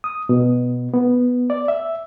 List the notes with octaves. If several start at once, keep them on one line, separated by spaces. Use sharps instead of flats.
D#6
B2
B3
D5
E5